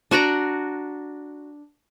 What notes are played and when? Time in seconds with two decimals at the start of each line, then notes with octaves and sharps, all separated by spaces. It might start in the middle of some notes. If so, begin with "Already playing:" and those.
0.11 D4 F#4 D5 A#5